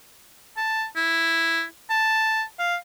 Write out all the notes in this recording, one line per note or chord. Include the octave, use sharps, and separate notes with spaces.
A5
E4
A5
F5